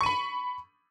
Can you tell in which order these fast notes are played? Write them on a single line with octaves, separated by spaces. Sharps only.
C#6 D#7 B5